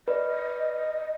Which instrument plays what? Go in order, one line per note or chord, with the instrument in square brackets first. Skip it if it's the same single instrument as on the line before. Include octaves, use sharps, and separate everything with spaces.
[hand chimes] B4 D5 [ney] D#5